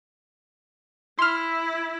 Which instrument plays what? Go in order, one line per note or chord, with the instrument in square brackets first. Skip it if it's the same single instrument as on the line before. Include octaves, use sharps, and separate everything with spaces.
[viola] E4 [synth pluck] C6 F6